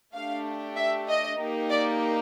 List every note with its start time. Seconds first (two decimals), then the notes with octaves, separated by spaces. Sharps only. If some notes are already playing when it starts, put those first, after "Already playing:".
0.14 A3 D4 G4 F5
0.76 E5
1.08 D#5
1.39 A#3 D#4 G4
1.70 D5